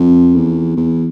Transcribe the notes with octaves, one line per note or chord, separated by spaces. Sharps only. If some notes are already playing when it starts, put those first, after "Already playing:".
Already playing: F2
E2
E2